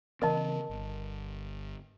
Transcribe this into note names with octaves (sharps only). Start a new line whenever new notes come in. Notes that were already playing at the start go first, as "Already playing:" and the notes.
C#3 E3 C4 A#4 D#5 A5
G1